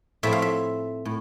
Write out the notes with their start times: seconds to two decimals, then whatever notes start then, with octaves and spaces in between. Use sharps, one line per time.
0.23 A2 F3 A3 C4 E5
0.33 F5
0.42 E5
1.05 A2